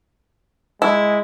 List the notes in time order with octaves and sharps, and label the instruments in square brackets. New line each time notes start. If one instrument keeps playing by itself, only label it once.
[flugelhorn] G#3 [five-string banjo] E4